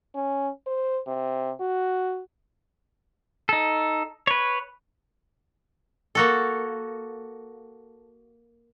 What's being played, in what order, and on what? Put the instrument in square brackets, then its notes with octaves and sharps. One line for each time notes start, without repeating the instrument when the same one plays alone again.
[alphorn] C#4
C5
C3
F#4
[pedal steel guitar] D#4 A4
B4 C#5
[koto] A#3 F#4 A4